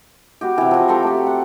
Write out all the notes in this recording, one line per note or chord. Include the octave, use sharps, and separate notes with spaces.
B3 F#4 G4
C3 E3
F3 F#4
G4 A4 A#5 C6
A3 G4
F#5